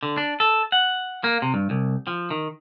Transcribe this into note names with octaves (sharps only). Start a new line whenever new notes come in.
D3
D4
A4
F#5
A#3
C3
G2
C2
F3
D#3